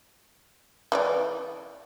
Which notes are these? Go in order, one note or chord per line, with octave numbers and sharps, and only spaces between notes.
E3 B4 D5